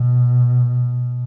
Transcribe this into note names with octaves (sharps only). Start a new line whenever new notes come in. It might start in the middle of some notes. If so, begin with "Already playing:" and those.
Already playing: B2